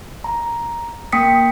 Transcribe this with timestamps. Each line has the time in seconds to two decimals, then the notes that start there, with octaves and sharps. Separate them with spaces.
0.24 A#5
1.12 A#3 G5 D#6 B6 C#7